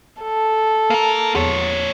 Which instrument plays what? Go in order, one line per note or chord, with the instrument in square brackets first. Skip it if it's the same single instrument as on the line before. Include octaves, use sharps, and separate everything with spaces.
[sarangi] A4
[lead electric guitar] A#3 A#4
[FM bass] E2 [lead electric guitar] F3 C#5